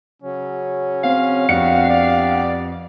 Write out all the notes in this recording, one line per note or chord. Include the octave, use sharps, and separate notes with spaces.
C#3 F#3 C#4
C4 F5
F2 B3 D4 F#4 G4 F#5 C#7
D5